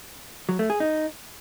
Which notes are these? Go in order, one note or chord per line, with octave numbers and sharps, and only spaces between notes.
F#3
A3
G#4
D#4